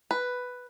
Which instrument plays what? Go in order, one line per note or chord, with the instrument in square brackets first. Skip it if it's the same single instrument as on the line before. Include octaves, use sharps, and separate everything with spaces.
[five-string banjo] B4